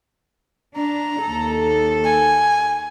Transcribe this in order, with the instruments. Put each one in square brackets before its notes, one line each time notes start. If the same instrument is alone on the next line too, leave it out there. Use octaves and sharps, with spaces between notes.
[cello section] D4 [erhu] A#5
[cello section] D#2 A4
[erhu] G#5